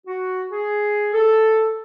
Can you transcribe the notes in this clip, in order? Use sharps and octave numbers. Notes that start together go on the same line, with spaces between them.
F#4
G#4
A4